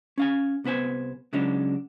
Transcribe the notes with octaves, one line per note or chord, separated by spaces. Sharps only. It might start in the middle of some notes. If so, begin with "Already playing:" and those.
C#4 F5 G#5
C2 B3 B4 C5 G#5
C#3 F#3 G#3 C#4 D4